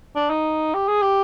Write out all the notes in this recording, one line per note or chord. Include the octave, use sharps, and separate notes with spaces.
D4
D#4
G4
G#4
G4